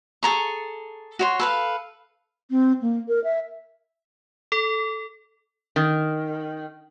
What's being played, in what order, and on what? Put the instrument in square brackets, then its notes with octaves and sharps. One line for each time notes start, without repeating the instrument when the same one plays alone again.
[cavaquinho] G#4 A4 A#5 C#6
F#4 C#5 C6
A4 B4 F5
[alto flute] C4
A#3
A#4
E5
[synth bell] A4
[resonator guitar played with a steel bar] D#3